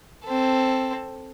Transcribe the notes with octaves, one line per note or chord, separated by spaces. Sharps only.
C4 A4